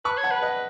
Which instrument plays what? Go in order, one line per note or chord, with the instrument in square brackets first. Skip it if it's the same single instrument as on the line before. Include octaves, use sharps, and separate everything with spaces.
[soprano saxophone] B4 [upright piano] A5 C#6
[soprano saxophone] C#5
[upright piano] F#5 A5
[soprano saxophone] B4
[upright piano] D#5 F#5